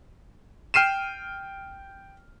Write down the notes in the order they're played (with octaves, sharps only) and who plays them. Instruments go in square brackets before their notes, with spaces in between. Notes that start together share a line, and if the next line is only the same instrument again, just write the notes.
[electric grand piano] G5 F6 C7 D#7 E7